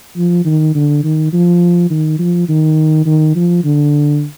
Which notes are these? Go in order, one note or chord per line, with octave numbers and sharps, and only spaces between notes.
F3
D#3
D3
D#3
F3
D#3
F3
D#3
D#3
F3
D3